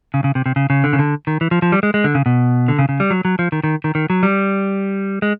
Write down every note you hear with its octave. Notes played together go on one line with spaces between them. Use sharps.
C#3
C#3
C3
C3
C#3
C#3
D3
C#3
D3
D#3
E3
F3
F3
G3
G#3
G#3
D3
C#3
B2
D3
C#3
C#3
G3
F#3
F#3
F3
D#3
D#3
D#3
D#3
F#3
G3
G#3